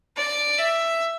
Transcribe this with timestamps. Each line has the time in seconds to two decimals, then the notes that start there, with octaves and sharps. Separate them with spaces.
0.17 D5
0.58 E5